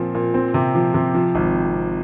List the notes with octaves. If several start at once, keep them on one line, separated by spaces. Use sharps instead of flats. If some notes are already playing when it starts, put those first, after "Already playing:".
Already playing: A#2 F3 C4
A#2
C4
C3
F3
C3
F3
G#1